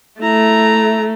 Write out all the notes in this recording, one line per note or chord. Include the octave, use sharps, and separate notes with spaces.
A3 E4 A#5